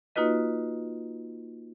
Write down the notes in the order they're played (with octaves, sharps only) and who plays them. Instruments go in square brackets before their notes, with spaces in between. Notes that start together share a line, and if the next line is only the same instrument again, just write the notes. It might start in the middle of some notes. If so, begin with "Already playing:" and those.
[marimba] A#3 D#4 F4 F#4 B4 D#5